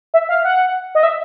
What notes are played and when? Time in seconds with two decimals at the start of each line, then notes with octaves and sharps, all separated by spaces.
0.14 E5
0.29 F5
0.44 F#5
0.95 D#5
1.03 E5